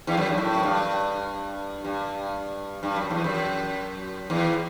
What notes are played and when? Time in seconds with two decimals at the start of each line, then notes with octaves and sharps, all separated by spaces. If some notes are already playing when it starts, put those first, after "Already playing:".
0.07 E2
0.17 F#2
0.29 G2
0.38 A2
0.55 F#2
0.63 G2
1.85 G2
2.83 G2
2.96 F#2
3.10 E2
3.24 F#2
4.30 E2